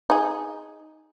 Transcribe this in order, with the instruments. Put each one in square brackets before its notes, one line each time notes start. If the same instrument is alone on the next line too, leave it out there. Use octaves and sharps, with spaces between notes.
[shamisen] D#4 G#4